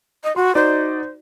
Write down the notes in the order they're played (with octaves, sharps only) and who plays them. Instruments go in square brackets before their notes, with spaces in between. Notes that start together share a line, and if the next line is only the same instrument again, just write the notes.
[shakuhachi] D#5
[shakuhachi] F#4 [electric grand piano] C6
[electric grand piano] D#4 F#4 D5 [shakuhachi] C5